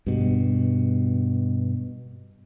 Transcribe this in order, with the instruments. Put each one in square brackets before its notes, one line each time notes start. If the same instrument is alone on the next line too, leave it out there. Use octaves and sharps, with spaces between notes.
[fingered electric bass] G2 B2